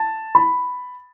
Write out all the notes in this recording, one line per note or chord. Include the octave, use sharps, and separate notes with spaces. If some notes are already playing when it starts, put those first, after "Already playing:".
Already playing: A5
B5